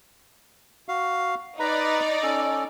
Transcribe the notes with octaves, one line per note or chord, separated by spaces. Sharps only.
F#4 F5
D#4 B4 D5 A#5 B5
C#4 A4